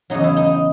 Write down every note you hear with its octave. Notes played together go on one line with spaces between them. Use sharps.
E2 C#3 F#3 D#4
E4
D#4